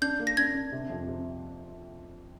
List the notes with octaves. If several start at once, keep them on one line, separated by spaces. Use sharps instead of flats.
D4 G6
A#3
A#6
D4 G#6
D4
C3
F2
C3